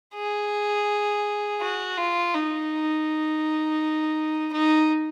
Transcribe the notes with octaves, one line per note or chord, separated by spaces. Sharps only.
G#4
F#4
F4
D#4
D#4